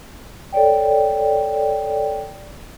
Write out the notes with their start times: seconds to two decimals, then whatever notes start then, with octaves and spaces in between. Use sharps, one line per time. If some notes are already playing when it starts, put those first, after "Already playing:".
0.53 A4 C#5 D5 G5